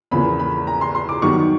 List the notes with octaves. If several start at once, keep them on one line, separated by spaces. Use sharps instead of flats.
E2 C#3 F3 A#3 B5
B5
A#5
C6
C6
D6
F#2 D#3 G3 B3 D#4 C#6